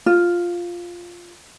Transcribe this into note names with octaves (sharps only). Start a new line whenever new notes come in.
F4